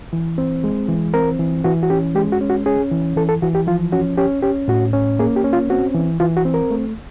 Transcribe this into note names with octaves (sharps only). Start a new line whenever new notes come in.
E3
C4
G#3
E3
C4 A#4
E3
E3 F#4
F#4
C#4 G4
G#3 G4
F#4
C#4
F#4
C#4 G#4
E3
E3 A4
A4
E3 F#4
G4
F3 F4
C#4 F#4
C#4 G4
C#4 G4
A2 F#4
C#4
A#3 G#4
G4
C#4
F4
C4 F#4
E3
E3 F4
F#4
C4
A#4
A3